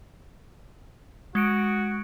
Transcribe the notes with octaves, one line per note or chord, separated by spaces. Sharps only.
G#3 F#4 C#7 D7